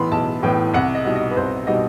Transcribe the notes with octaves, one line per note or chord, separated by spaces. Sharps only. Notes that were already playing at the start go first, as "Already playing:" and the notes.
Already playing: B1 A2 E3 B3 B5 C6
B1 A5
A2 E3 B3 G5
C2 F#5
D#5
B2 G3 D#4
D#5
B4
C2 C5
B2 G3 D#4 D#5